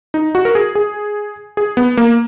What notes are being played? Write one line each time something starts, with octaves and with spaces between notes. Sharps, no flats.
D#4
F#4
A#4
G#4
G#4
G#4
B3
A#3